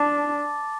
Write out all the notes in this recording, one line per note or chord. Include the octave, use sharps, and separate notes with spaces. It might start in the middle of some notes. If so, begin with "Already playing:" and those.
Already playing: D4 A5 D6 A6